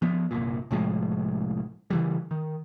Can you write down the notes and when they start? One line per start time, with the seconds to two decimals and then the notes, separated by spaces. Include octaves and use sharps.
0.02 F3 B3
0.31 G1 C2 A#2
0.71 C2 A2 F3 G#3
1.90 C#3 E3 G3
2.31 D#3